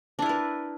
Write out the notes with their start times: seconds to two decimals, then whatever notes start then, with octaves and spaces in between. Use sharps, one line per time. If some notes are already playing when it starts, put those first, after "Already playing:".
0.19 D4
0.22 E4
0.26 A#4
0.29 B4